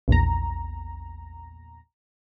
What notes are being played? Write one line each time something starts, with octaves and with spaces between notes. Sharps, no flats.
A#1 E2 A#5